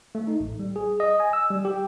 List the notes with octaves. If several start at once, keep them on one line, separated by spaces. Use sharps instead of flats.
A3
D#4
A1
G3
G#4
D#5
G#5
E6
G3
G4